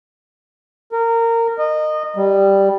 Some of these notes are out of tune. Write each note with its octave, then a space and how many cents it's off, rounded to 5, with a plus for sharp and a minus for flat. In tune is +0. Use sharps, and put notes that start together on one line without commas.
A#4 -20
D#5 -20
G3 +0